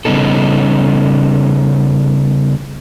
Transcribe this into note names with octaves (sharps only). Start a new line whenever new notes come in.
C#3 G3 B3 C#4 D#4 A4